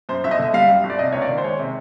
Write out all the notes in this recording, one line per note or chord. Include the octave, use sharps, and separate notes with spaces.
F#2 C5
G1 E5
D#5
D3 E5
G3 F5
F#2
G1
D5
C3 D#5
C#2 C#5
D5
D#3
C5
G#3 C#5
C3